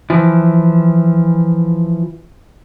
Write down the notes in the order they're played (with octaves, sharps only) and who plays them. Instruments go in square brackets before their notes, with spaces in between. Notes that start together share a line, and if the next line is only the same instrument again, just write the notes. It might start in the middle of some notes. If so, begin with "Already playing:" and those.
[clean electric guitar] E3 F3